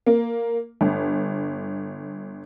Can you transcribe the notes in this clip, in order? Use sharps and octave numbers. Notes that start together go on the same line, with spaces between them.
A#3
G1